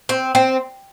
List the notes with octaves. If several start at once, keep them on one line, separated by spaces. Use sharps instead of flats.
C4
C4